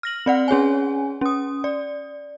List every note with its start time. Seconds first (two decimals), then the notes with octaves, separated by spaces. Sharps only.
0.03 F6 A#6 F#7
0.26 C4 D5 F#5
0.48 C#4 G#4 C#5 G#5
1.21 C#4 D#6
1.64 D5